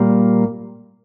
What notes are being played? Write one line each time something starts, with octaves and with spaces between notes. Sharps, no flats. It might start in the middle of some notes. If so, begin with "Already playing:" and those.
Already playing: A#2 G3 A#3